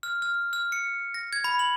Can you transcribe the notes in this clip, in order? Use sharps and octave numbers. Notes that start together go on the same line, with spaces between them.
F6
F6
F6
C#7
A#6
G#6
B5
F#7